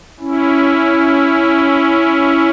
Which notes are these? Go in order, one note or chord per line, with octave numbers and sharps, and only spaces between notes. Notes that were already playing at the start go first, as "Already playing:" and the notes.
C#4 E4